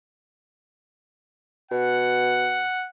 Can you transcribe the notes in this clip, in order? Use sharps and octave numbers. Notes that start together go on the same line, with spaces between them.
B2 F#5